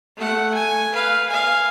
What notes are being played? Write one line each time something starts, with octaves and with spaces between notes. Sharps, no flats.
A3 F#5
G#5
B4 F5
F5 G#5